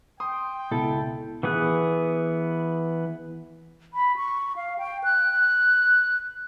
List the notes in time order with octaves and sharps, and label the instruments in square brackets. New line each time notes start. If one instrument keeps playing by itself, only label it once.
[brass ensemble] G5 [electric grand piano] C6 D#6
[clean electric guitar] C#2 B2 A4 [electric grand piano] E4
[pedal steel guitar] E3 B3 G#4 F#6
[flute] B5
C#6
F5
G5
F#6